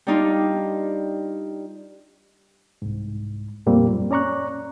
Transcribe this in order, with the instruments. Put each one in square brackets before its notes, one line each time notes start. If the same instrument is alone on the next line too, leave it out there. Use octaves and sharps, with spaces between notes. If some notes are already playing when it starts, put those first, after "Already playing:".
[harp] G3 D4 D#4 F4
[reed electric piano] C2 G#2
F2 A#2 G3 A#3 C4
F#2
C#4 D5 A#5 C#6 F#6